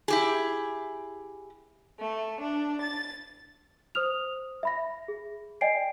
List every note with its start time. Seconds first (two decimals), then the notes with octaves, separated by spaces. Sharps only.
0.08 E4 G4 G#4
1.99 A3
2.40 D4
2.80 A6
3.95 C5 D#6 F6 F7
4.63 E5 B5 A#6
5.08 G#4
5.61 D5 D#5 G5 G#5 C7 D7